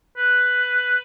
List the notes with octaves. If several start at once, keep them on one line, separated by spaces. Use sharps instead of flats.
B4